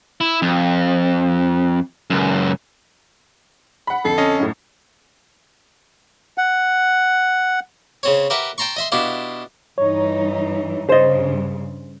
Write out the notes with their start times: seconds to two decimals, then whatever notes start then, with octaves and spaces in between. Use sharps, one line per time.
0.21 E4
0.42 F2
2.10 C#2 F#2
3.87 F#5 B5
4.05 F2 D3 A4 C7
4.18 C#4 D#5
4.40 F#2 A2
6.38 F#5
8.03 C#3 C4 C#5
8.30 G4 A#4 B4 E5 F#5
8.58 G5 A5 A#5 C6 C#6
8.76 D#5 E5 C6
8.92 B2 D4 E4 G4 F5
9.78 G2 E3 D#4 C#5
10.89 G2 C#3 C5 D#5